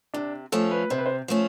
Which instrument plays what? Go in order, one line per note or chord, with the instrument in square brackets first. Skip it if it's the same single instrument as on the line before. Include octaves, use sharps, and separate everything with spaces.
[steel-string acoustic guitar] C3 [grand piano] D4
[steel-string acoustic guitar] F3 A3 C#4 [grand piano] A4
[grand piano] B4
[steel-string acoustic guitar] C3 [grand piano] C5
[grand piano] B4
C5
[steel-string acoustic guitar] F3 A3 C#4